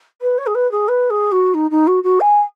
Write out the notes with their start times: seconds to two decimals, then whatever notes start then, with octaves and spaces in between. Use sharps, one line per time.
0.21 B4
0.38 C#5
0.46 G#4
0.54 B4
0.71 G#4
0.88 B4
1.10 G#4
1.31 F#4
1.54 D#4
1.70 D#4
1.87 F#4
2.03 F#4
2.20 G#5